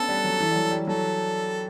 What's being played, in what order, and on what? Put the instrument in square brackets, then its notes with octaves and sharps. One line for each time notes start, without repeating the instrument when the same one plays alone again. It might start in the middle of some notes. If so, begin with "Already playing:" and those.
Already playing: [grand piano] A3 B3 C#4 D4 [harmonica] A4
[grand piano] G3
F#3
E3
G3
F#3
G3
[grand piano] F#3 [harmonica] A4